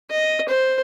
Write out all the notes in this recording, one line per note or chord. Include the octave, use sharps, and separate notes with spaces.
D#5
C5